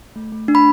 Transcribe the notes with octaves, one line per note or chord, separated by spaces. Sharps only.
A3
A3
D4
B5